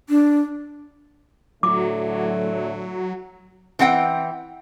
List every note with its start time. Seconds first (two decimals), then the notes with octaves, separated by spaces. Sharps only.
0.09 D4
1.63 A2 D3 F#3 A3 D6
3.79 E3 C4 F#5 G5